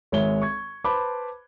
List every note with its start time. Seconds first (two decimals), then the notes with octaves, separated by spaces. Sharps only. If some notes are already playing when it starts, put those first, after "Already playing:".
0.12 G#1 G#3 C#5 E5 G7
0.42 C#6 G#6
0.84 B4 C5 A5 B5 D6